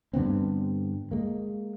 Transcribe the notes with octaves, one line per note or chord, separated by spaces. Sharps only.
G2 D3 B3 C4
G#3 A#3